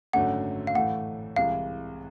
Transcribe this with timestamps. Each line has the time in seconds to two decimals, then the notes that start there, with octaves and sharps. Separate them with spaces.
0.13 G#1 F#2 D3 F#3 A3 F#5
0.67 F5
0.75 A2 E3 A3 F#5
1.36 C2 C3 E3 G#3 F5